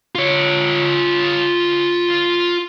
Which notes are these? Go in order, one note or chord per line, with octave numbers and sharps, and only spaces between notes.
F4 C#5